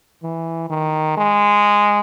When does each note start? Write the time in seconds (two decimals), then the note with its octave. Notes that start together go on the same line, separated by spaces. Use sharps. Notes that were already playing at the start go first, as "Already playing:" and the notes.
0.23 E3
0.70 D#3
1.17 G#3